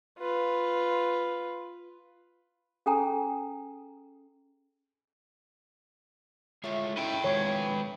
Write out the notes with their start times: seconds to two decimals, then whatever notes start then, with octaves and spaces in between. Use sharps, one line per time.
0.19 F4 B4
2.86 C#4 G#4 A4 G5 G#5 A#5
6.64 A2 G#3 A3 F4 C#5
6.97 C#4 D#4 E4 B4 G5
7.24 D#3 F3 G#3 C#5